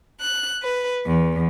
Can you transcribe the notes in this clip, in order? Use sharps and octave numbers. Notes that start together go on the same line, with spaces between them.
F#6
B4
E2